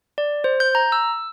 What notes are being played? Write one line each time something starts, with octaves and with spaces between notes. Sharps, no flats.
D5
C5
G6
A#5
E6